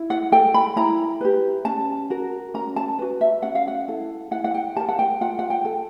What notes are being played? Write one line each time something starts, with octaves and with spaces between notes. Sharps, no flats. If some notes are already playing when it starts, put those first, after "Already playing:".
Already playing: E4
F#5
A4 G5
B5
E4 A#5
G4 B4
C#4 A5
F#4 A#4
C#4 A#5
A5
F#4 B4
E5
C#4 F#5
F5
F#5
E4 A4
E4 F#5
F#5
G5
G4 A#4 A5
F#5
G5
F4 F#5
F#5
G5
A4